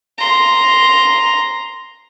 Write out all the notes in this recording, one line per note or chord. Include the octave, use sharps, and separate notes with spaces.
A#5 C6